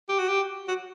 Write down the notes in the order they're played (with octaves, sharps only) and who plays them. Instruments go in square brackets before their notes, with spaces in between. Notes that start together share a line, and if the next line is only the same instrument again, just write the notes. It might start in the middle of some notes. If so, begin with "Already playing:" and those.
[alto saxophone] G4
F#4
G4
F#4